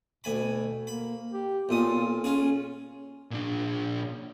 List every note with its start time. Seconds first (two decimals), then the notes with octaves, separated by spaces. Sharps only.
0.24 D2 B2 G#5 B5
0.87 A#3 B5
1.33 G4
1.69 B1 A#2 F4 D#6
2.24 C#4 F4 G#4
3.31 A#2 D4